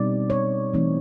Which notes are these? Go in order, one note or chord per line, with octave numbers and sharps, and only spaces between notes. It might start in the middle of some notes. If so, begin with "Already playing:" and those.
Already playing: B2 G3 C4 D#4 D5
C#5
E3 A3 C4 D#4